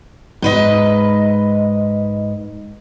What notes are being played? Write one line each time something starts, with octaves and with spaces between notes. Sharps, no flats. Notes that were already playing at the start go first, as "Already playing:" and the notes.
G#2 B4 D#5